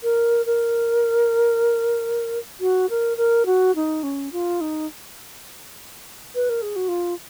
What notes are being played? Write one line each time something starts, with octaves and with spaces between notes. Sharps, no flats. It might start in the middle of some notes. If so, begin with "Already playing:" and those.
A#4
A#4
F#4
A#4
A#4
F#4
D#4
C#4
F4
D#4
B4
A#4
G#4
F#4
F4